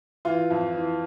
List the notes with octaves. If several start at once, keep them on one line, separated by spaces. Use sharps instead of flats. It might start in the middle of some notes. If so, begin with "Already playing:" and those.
E3 F4
F2
E3